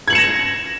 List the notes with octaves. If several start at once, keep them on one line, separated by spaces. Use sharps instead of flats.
G#6 A#6 C#7 E7 F#7